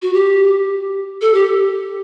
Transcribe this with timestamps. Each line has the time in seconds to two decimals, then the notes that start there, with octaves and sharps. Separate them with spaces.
0.02 F#4
0.13 G4
1.21 A4
1.34 G4